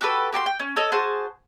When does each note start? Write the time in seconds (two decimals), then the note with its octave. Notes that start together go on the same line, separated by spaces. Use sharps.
0.01 F#4 G4 A4 B4
0.33 F#4 G4 A5 C6
0.46 G5
0.59 C#4
0.76 A4 C#5 D#5
0.92 F#4 G#4 C5 A5